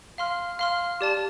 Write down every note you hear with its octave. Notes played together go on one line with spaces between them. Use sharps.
F5 C6 F6
F5 C6 F6
G4 D5 A5